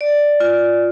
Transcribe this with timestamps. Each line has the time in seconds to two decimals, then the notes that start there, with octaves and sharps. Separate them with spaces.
0.01 D5
0.40 F4